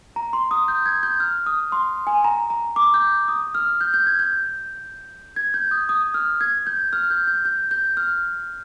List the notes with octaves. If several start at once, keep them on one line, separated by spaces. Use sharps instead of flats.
A#5
C6
D#6
G6
G#6
G6
F6
D#6
C6
G#5
A#5
A#5
D6
G6
D#6
F6
G6
G6
G#6
G6
G#6
G6
D#6
D#6
F6
G#6
G6
F6
G6
G6
G6
G6
F6